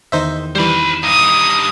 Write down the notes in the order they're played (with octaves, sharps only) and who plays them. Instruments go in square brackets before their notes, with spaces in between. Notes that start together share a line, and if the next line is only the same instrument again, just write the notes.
[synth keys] E2 D#3 [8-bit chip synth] D#4 C5 E5
[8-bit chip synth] E3 G3 [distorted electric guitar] C5 B5
[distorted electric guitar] G2 D#4 [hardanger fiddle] D#6